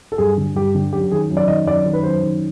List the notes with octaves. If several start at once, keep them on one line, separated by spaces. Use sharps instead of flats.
A4
G2 G#4
D3
G2 G4
D3
F#2 G4
D#3 G#4
F#2
D5
D#3 D#5
F#2 D5
D#3
B4
F#2 C5
D#3